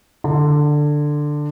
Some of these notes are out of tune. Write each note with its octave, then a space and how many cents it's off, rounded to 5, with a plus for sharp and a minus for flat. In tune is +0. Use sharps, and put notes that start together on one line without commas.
D3 +10